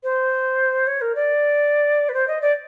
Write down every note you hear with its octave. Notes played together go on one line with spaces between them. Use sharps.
C5
C#5
A#4
D5
B4
C5
D#5
D5